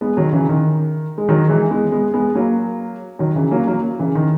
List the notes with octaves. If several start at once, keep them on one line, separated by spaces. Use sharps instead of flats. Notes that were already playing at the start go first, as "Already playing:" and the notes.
G#3 B3
D#3 F#3
C#3 E3
D#3
G#3
D#3 F#3
E3 G#3
G#3 B3
G#3 B3
G#3 B3
F#3 A#3
D#3 F#3
C#3 E3
F#3 A#3
F#3 A#3
C#3 E3
D#3